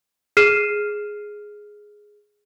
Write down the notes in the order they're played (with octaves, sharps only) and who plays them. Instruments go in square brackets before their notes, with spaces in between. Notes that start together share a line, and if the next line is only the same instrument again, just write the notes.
[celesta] G#4 F6 C7 D#7 E7